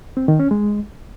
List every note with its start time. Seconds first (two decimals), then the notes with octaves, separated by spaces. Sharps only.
0.17 C4
0.28 D#3
0.40 C#4
0.51 G#3